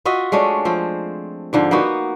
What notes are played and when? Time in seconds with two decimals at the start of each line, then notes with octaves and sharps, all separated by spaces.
0.05 F4 F#4 D#5 E5
0.32 G#3 A3 C#4 D4
0.65 F3 C4
1.53 G#2 D3 F3
1.71 A#3 B3 D#4 F#4